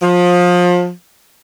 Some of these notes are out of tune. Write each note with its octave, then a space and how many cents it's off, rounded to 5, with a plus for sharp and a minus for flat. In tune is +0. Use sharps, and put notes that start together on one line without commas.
F3 +25